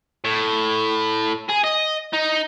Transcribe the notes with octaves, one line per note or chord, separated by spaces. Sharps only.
A2
G#4
D#5
D#4